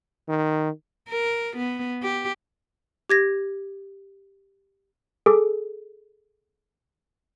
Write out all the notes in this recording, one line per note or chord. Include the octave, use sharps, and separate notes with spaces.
D#3
A#4
B3
G4
G4 G#6 A#6
G#4 A4 D6